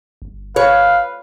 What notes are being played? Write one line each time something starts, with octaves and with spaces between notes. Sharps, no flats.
G1
B4 C#5 F5